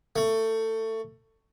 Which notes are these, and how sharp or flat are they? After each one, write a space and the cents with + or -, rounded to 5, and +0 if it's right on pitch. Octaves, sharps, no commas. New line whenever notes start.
A3 +20